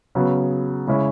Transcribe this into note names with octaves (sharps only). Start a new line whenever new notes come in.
C#3 F#3 B3
C#3 G#3 C#4 E4